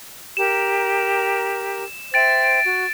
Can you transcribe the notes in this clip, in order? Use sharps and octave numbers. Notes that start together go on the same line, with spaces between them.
G4 A#4 A#5 E7
C5 E5 G5 A6 D7
F#4